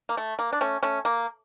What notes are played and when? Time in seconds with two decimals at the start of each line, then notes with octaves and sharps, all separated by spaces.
0.09 A#3
0.17 A3
0.39 A#3
0.53 D4
0.61 A3 C#4
0.83 A3 C#4
1.05 A#3